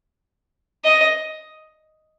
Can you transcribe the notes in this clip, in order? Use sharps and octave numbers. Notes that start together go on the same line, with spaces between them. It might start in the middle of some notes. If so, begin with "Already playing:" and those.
D#5